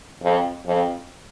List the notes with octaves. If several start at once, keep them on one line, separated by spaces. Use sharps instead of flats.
F2
F2